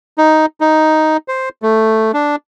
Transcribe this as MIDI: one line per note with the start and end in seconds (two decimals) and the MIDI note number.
0.18 0.46 63
0.61 1.17 63
1.28 1.49 72
1.62 2.12 57
2.14 2.36 62